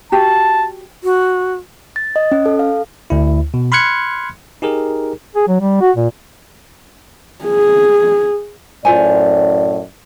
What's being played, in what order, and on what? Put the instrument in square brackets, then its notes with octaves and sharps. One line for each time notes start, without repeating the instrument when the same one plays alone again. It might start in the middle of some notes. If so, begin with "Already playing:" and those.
[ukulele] F#4 G4 [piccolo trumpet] A5
[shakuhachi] F#4
[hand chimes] A6
D#5
C#4
A4
F5
[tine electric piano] D2 E4
B2
B5 C6 F6 F#6 G#6 C#7
D#4 G4 G#4 A#4
[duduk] G#4
F#3
G3
F#4
A#2
[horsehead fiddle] G#4
[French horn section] F#2 A2 D5 [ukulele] F4 C5 G#5